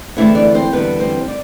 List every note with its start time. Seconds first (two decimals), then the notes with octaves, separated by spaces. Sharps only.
0.17 E2 D3 A3 C4 E4 E5
0.35 D4 D5
0.54 C4 C5
0.72 E2 D3 G3 B3 B4
1.00 C4 C5
1.28 D5